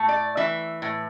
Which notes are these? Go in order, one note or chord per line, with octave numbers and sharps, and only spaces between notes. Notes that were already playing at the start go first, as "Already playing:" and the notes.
Already playing: A2 A3
D5
E3 E5
A2